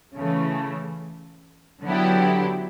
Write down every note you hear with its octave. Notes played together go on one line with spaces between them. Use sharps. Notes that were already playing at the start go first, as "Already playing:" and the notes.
C#3 E3 A3
D3 F#3 B3 E4 G4